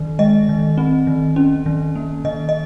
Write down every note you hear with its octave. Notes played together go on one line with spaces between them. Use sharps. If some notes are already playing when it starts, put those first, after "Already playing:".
Already playing: D#3
G#3 D#5
D#3
C4
D#3
C#4
D#3
A#3
D#3 D#5
D#5